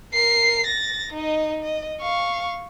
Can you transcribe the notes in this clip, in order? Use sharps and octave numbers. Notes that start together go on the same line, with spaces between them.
A#4 C7
A6 A#6
D#4 D#5
D#5
F5 C#6